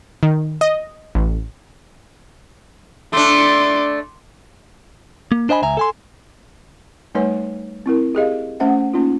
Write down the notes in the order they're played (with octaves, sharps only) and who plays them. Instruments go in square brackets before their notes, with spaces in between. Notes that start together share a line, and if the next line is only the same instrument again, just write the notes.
[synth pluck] D#3
D#5
A1
[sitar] A3 D4 [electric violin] C6 D6
[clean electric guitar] A#3
D4 C5 D#5 G#5 B5
C#2 E5 G#5 A#5
A4 G#5 C6
[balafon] G3 A3 D#4 B4 C#5 G#5
C4 E4 A#4
G4 G#4 D#5 F5
A3 C#4 C5 E5 F#5
A#3 C#4 D#4 F4